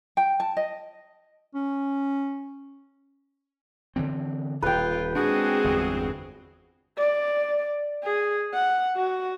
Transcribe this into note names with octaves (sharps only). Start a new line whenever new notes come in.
G5
A5
D#5
C#4
D3 E3 C4
D#1 F4 B4 G5
G#3 C4 D4 F#4 G#4
G1 E2 G2
D5
G#4
F#5
F#4